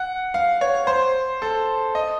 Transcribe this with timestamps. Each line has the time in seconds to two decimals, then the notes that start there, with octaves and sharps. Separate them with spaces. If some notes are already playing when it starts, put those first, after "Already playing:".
Already playing: F#5
0.34 F5
0.61 C#5
0.87 C5
1.42 A4
1.95 D#5